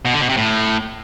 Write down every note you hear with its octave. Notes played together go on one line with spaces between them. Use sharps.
B2
D3
B2
C3
A2